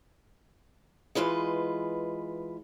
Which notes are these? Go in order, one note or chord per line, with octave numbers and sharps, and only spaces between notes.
E3 G#3 F4 B4 D#5